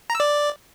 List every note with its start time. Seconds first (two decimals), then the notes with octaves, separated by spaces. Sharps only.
0.10 A#5
0.15 E6
0.20 D5